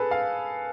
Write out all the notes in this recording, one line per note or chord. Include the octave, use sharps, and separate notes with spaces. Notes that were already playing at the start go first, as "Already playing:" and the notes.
Already playing: G#4 A4 B4
F5